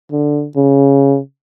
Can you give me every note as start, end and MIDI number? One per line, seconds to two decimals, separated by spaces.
0.11 0.47 50
0.56 1.19 49